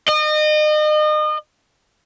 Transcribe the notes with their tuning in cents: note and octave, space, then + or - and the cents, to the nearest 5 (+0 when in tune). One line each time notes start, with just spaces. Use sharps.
D#5 -35